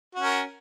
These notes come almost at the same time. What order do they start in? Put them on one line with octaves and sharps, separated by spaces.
F#4 C#4 A#4